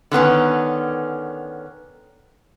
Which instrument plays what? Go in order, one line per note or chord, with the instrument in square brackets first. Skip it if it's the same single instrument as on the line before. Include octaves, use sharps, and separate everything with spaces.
[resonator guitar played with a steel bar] D3 D#3 B3 C#4